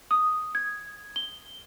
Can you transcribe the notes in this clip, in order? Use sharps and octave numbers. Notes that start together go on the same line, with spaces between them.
D#6
G#6
G7